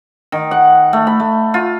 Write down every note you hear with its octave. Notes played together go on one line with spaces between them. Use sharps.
D#3
F#5
A3
B5
A3
F4